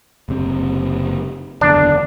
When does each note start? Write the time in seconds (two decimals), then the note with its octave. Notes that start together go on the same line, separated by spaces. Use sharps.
0.29 F#1 C3 C4
1.61 F#1 E2 D3 D4